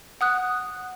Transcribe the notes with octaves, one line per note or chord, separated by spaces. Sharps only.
F#5 D#6 F#6